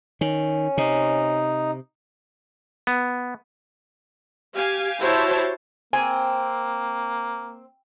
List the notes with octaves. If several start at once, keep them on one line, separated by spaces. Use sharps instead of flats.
D#3 C#4
C3 D#4
B3
G4 F5 G#5
E4 F#4 G4 C5 C#5 A5
A#3 C4 G#5